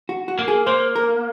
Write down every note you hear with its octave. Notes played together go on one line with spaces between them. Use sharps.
F#4
F#4
A#3
G#4
A#3 C5
A#4